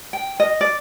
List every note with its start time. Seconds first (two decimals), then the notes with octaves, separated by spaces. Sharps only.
0.13 G5
0.40 D#5
0.61 D5